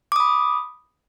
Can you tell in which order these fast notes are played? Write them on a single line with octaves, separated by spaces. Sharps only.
D6 D#6 B5